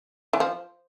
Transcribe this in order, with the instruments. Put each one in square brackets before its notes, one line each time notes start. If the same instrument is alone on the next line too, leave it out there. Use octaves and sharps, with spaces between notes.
[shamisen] E3
F3